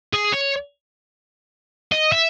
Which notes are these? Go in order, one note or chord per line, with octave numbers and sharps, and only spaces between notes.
G#4
C#5
D#5
E5